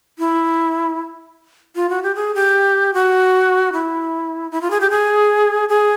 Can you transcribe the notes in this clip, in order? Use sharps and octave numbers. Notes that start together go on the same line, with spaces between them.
E4
F4
F#4
G4
G#4
G4
F#4
E4
E4
F4
G#4
G4
G#4
G#4